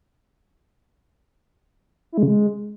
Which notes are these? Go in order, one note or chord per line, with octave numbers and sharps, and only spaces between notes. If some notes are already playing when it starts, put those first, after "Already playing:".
E4
G#3
C#3
G#3